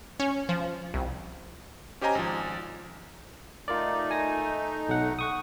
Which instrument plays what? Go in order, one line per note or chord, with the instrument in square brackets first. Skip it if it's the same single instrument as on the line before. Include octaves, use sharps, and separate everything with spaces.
[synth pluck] C#4
F3
C2
[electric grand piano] C#4 G4 C5 D#5 G#5 A#5
G#1 F3
[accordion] A3 D#4 [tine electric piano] F4 A#4 D5
[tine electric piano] G#5 A#6
B1 F#5
F#5 C#6 D#6